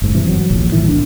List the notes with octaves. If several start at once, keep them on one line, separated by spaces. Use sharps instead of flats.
F#1 G#2
G2 C3 E3
E3 F#3
D#1 A#1 D#2
A2 D#3 E3
B1 D4